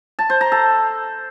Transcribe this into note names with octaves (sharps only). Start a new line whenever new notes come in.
A5
C5
A#5
A4